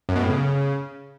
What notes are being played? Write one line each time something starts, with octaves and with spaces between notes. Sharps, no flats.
F#2
B2
A2
C#3